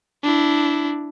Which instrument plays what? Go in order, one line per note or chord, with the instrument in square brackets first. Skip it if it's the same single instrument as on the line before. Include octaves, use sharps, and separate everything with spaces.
[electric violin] D4 E4